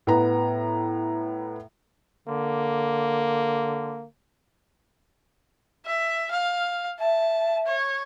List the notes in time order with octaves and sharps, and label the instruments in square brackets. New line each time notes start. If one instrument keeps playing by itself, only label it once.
[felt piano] A2 B3 A#5
[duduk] D3 [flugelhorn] A#3
[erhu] E5
F5
[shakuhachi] E5 [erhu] A5
[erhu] C#5